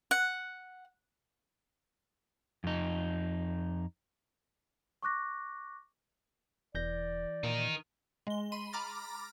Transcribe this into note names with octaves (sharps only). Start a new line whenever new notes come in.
F#5
F2 D#4
C#6 D6 F#6 A#6
E1 E3 D5 G6 A#6
A#2 D#4 A#4
G#3 G7
B5 C6 D#7
A#5 B5 D6 F6 A6 A#6